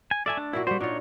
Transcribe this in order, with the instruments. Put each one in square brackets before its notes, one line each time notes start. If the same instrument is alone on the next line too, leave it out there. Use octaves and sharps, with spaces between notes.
[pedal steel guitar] G#5
[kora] A3 A4 [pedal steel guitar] D5 E5 G#5
[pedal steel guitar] D4
[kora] A#2 A#3 F#4 [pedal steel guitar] E4
[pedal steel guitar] G3 C5 [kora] F#4
[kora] A#2 F4 [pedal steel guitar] D4 D#4 C#5